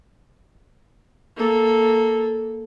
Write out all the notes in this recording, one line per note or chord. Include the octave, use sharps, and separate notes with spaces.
A#3 A4